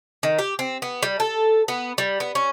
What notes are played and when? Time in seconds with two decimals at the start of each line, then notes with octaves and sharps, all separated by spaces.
0.23 D#3
0.39 G4
0.59 C4
0.82 B3
1.03 G3
1.20 A4
1.68 B3
1.98 G3
2.20 B3
2.35 C#4